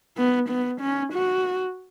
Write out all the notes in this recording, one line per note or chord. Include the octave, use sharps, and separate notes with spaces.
B3
B3
C#4
F#4